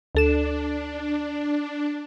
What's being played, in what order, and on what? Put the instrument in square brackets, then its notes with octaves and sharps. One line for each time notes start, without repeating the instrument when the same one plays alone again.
[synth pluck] D2 A4 E7 [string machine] D4